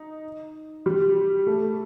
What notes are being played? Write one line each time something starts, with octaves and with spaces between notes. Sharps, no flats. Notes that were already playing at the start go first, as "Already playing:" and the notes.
Already playing: D#4
G3
A3